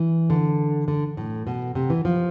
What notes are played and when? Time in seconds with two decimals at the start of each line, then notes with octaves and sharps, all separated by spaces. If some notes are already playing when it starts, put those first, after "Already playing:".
Already playing: E3
0.30 D3
0.88 D3
1.17 A2
1.47 B2
1.75 C3
1.90 E3
2.05 F3